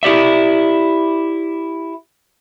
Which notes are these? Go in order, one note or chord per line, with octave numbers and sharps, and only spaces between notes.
E4 G4 D5 E5